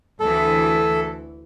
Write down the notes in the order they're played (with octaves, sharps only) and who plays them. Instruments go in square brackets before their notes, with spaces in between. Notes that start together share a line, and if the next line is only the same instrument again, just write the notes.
[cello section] D2 E3 [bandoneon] A4